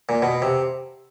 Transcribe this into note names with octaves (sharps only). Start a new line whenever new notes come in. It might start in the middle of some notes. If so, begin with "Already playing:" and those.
A#2
B2
C3